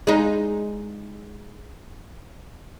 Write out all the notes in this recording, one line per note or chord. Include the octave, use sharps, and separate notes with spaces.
G#3 D#4